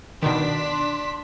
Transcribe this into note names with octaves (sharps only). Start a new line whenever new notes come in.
B2 D#3 D4 C6 B6